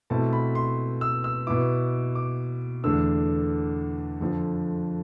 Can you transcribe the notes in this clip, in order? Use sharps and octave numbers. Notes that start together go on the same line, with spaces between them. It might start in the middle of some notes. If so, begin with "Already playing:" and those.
B2 A3 C4 E4 A5
B5
C6
E6
E6
B2 B3 E4 D6
D6
E2 D3 A3 D4 E6
F2 D3 F3